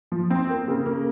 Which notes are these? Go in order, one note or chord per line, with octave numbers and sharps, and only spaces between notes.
F3
C4
A#3
C#3
A#3